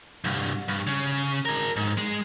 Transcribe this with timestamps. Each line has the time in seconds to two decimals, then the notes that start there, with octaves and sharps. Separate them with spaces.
0.24 C2 G2
0.68 G2
0.87 C#3
1.45 G#4 A#4
1.76 G#2
1.98 G#3